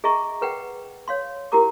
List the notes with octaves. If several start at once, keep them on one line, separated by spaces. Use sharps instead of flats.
G#4 D#5 E5 A#5 C#6
G#4 B4 F#5 G5
C#5 F5 C6
E4 F4 G4 A#4 A#5 D6